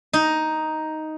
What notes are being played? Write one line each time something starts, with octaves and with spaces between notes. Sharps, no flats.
D#4